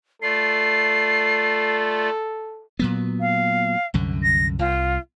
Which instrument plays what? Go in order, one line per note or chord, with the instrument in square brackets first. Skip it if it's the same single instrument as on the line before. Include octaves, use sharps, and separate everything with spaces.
[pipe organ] A3 F4 D5 [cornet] A4 [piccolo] C7
[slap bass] A#2 F#3 B3
[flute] F5
[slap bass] C2 F#2 D3
[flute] A#6
[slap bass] C2 [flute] F4